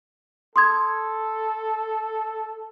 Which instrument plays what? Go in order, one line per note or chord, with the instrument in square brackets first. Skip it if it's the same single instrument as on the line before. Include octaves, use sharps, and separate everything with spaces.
[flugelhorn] A4 [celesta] C6 D#6 G#6